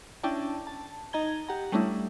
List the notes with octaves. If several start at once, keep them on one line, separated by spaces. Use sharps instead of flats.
C#4 D4 E4 D5 G5 A5
A5
D#4 D#5 A#5 G#6 G7
G4 F#5 A#5
G3 A3 C#4 D4 E4